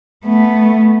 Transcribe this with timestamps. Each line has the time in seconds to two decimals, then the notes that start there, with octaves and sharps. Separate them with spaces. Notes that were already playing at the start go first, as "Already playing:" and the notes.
0.25 A3 B3